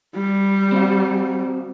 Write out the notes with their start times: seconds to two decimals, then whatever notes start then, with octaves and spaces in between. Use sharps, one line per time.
0.15 G3
0.72 C4 F#4 F5